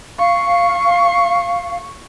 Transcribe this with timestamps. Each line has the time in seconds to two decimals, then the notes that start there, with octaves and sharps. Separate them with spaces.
0.18 F5 C#6